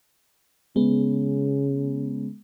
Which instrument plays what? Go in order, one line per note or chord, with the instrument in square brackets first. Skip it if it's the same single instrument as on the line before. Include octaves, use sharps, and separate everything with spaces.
[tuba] C#3 [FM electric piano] G#3 B3